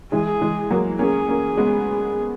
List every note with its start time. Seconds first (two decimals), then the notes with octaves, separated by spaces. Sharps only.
0.12 E3 G#3 G#4
0.41 E3 G#3
0.71 F#3 A#3
0.99 A#3 C#4 G#4
1.29 A#3 C#4
1.57 G#3 B3